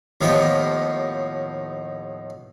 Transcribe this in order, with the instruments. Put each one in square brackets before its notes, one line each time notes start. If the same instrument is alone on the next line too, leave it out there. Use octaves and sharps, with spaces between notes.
[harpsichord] D#2 A2 D#3 F3 B3 G4